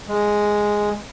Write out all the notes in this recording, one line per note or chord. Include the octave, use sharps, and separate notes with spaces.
G#3